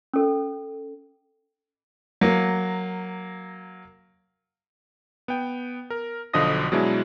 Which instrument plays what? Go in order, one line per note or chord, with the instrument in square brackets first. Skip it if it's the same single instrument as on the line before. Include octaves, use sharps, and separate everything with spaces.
[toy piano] C#4 A4
[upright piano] F#3 A#3
[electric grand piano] B3 G5
A#4
B1 D3 F3 D#5 D#6 A#6
B2 F#3 G#3 D4 E4